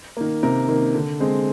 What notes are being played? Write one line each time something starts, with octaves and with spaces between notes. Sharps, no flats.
D#3 A#3
C3 A#4
D#3 A#3
D3
G#3 C4